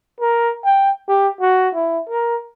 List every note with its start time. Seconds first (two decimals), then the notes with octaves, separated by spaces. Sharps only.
0.20 A#4
0.64 G5
1.08 G4
1.41 F#4
1.74 E4
2.09 A#4